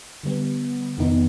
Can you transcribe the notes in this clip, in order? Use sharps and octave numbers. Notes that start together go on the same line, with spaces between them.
D3 G3 B3
F2 C3 D#3 B3 D#4